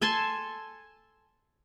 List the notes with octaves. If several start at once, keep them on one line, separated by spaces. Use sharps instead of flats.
A4 G#5 A5 C6